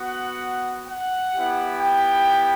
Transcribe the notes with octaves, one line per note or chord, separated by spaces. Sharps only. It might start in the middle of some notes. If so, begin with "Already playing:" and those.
Already playing: B3 F#4 F#5
F#5
B3 E4 G4
G5